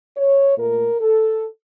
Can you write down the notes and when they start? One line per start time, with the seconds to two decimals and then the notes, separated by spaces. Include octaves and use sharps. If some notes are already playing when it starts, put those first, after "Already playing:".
0.17 C#5
0.58 A#2 A3 A#4
1.00 A4